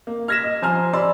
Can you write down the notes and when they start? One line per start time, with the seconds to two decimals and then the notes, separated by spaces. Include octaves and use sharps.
0.07 A#3
0.28 F6 G#6 A#6 B6 E7
0.43 D#5
0.62 F3 C5 G#5 A#5 F6
0.93 D5 B5 C6 E6